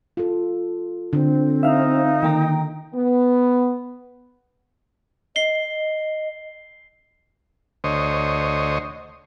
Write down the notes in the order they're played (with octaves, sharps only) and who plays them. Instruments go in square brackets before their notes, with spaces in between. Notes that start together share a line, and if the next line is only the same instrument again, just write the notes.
[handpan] F4 A4
[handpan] D3 [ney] C4
[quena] D#4 [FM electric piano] E5 F5
[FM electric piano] D#3 A#3 A#5 [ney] G5
[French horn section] B3
[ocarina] D#5 [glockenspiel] C7 G7
[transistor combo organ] D2 C5 C#5 D#5